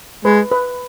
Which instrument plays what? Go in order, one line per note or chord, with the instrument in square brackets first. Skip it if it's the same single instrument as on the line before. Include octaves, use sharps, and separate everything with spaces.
[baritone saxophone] G#3 [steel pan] B4
[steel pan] B4